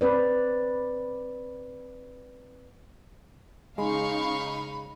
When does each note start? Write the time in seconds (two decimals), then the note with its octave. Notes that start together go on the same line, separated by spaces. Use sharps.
0.01 C4 B4 D5
3.78 C#3 G#3 D#4 F5 B5 C#6